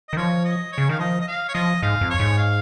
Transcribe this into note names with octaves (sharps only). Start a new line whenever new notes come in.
D#3 D#5
F3 C#5
D#5
C#5
C#3
D#3 F5
F3 D#5
D#5
F5
C#5
F3 D#5
G#2 F5
F2
C#5
G#2
F5